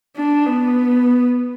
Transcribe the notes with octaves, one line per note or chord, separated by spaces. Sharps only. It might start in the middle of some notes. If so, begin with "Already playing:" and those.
D4
B3